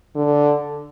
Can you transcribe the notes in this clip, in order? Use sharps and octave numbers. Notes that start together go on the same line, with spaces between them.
D3